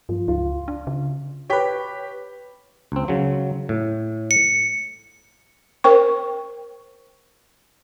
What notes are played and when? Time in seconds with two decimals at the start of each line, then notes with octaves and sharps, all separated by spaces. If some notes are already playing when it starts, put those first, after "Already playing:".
0.09 G2 F3
0.28 C#2 F4
0.68 D4
0.87 C#3
1.50 G4 B4 C#5 G5 B6
2.92 C#2 C4
3.08 C#3 F#3
3.69 A2
4.31 C#7
5.84 A#4 C5 G5 C#6